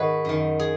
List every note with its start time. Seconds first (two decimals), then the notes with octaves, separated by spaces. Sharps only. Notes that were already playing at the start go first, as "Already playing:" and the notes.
Already playing: G#2 D#3 F#4 G#4 B4
0.25 F#2 D#3
0.60 G#4